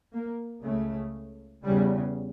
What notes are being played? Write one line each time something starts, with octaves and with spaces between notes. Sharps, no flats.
A#3
C#2 C#3 A3
E2 C#3 G3